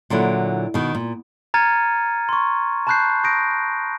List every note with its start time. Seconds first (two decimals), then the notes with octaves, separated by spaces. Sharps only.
0.10 A#2 D3 F#3 E4
0.74 B2 D#3
0.95 A#2
1.54 A#5 F6 G#6 A6 C#7 D#7
2.29 C6 C#6
2.87 A5 B5 C#6 F#6 G6 C7
3.24 C#6 D#6 G6 A#6 C7 D7